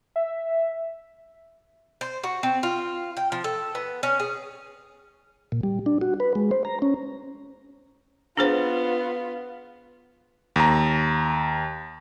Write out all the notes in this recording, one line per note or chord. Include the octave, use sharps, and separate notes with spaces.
E5
C5
F#4
C4
F4
G5
F3
A4
B3
C#4
G#4
A#2
G3
D4
F#4
B4
G#3
C5
A#5
C#4
B3 D4 F4 G#4 C5
D#2 A#5